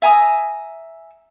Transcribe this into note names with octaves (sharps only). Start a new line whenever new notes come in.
E5 G#5 A#5 D#6